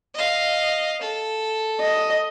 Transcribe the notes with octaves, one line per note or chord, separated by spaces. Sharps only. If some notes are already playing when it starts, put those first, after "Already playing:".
D#5 F5
A4
D#5